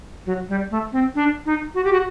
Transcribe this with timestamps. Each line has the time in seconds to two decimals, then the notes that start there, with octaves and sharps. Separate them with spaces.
0.26 F#3
0.49 G3
0.71 A3
0.93 C4
1.15 D4
1.46 D#4
1.75 F#4
1.85 G4
1.93 F#4